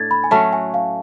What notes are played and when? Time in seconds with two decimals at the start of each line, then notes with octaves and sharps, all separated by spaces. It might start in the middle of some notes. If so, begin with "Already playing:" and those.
Already playing: A2 D4 G#6 A6
0.11 B5
0.24 G#5
0.31 F#3 A3 C#4 F#4 A5
0.53 G#5
0.74 F5